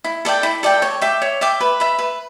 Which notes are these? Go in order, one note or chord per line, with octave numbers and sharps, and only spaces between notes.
E4
A4 D5 G5
E4
A4 D5 G5
C#5
E5 G5 D6
C#5
E5 G5 D6
B4
E5 B5
B4